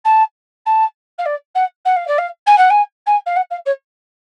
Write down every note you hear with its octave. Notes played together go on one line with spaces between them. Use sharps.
A5
A5
F5
D5
F#5
F#5
F5
D5
F5
G#5
F#5
G#5
G#5
F5
F#5
F5
C#5